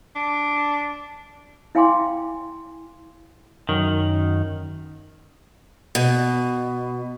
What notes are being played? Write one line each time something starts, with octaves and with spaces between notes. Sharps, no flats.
D4
E4 F5 G5 G#5 C6 D6
F#2 D#3
B2